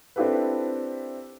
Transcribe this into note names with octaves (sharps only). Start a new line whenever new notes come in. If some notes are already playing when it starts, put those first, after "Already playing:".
C4 D4 E4 G4 A4 B4